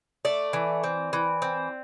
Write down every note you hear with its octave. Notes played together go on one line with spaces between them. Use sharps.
A3 D5
E3
C4
E3
C4